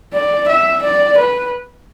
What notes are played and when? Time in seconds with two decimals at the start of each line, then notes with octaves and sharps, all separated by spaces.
0.13 D5
0.48 E5
0.83 D5
1.18 B4